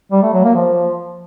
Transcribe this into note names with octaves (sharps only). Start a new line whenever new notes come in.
G3
A3
F#3
A#3
F3